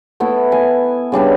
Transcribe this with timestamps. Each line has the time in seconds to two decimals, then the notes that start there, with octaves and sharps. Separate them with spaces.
0.20 A3 B3 E4
0.52 G#5
1.12 C#3 G3 D4 B4